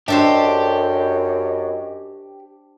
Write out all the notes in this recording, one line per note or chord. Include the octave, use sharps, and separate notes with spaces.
F#2 D4 G4 A4 C5 D#5